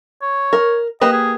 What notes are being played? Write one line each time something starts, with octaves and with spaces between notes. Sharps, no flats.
C#5
A#4
A#3 G4 B4 D#5
G#4